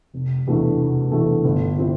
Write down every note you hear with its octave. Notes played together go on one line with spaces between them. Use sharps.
F1
E2 B2 A3 D4
F1
E2 B2 A3 D4
G1
F3 C4 E4